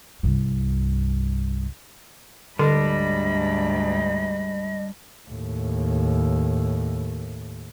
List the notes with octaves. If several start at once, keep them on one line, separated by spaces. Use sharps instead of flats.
C2 G2
D2 G#2 D3 G3 D4 A4 D#5 B5
D#2 A2